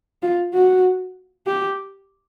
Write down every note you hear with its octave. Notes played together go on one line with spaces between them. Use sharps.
F4
F#4
G4